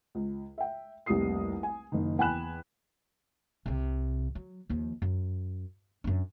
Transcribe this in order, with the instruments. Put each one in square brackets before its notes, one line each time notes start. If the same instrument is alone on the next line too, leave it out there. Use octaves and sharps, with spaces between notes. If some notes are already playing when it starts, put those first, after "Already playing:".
[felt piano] C#2
E5 G5
F1 C2 G3 A#3 D#6 C7
G#5
F#1 D#3
E2 G5 G#5 B5 F#6 E7
[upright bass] C2 C3
F#3
D#2 F3
F#2
F#2 D4